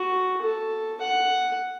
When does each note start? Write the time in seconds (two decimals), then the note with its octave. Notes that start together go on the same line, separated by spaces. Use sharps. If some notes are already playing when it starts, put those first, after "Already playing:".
Already playing: F#4
0.42 A4
1.01 F#5